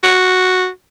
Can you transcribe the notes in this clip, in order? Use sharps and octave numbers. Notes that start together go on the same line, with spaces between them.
F#4